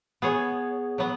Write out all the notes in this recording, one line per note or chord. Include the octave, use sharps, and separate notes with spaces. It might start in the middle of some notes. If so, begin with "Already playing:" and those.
B3 G#4 C#5
F#3 B3